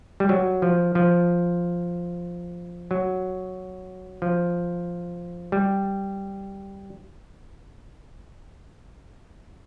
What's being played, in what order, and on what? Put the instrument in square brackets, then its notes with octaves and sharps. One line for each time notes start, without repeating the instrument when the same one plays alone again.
[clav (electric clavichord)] G3
F#3
F3
F3
F#3
F3
G3